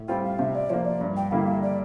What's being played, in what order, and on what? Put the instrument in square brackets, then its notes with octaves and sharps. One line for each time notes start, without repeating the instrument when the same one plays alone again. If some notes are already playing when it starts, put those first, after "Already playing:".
Already playing: [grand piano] A2
[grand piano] G3 C4 F4 [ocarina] G5
[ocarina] F5
[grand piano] C3 [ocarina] E5
[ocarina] D5
[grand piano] F3 A#3 [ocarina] C5
[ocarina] D5
[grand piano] G2
[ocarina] G5
[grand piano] D3 G3 A#3 E4 [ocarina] F5
[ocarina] E5
D5